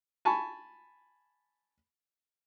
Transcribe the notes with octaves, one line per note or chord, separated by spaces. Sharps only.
G#5 A5 B5 C#6